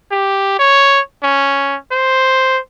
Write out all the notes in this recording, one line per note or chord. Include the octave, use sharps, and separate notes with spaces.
G4
C#5
C#4
C5